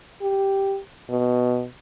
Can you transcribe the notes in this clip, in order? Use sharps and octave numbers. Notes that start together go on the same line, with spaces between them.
G4
B2